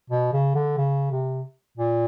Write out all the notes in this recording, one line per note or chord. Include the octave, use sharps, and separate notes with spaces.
B2
C#3
D3
C#3
C3
A#2